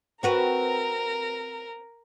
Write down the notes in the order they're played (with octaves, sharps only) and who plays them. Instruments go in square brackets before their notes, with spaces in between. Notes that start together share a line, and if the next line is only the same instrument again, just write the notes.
[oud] C4 F#4 B4 [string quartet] A#4 A#5